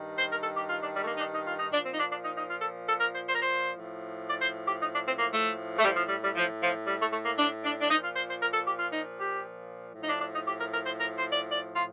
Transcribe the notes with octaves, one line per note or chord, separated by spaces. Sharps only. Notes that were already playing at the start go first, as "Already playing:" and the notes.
Already playing: G2 D#3
C5
A#4
A4
G4
F4
D4
G3
A3
A#3
D#4
D4
D#4
F4
D#4
A#2 F3 D4
C4
D#4
D4
D4
D#4
D#4
F4
A4
A4
A#4
C5
C5
A#4
C5
A2 F3
D5
C5
G4
D#4
D4
C4
A#3
A3
A3
A2 F3 G3
F3
G3
G3
F3
F3
G3
A3
A3
A#3
D4
D4
D4
A#2 F3 D#4
F4
C5
C5
A#4
A4
G4
F4
D#4
G4
A2 F3
D#4
D4
D4
D#4
G4
A#4
A#4
C5
A#4
C5
D5
D5
F4